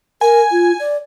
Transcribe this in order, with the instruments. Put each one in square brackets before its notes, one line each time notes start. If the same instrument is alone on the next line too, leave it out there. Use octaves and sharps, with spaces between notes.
[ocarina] A#4 [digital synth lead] G#5
[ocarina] F4
D5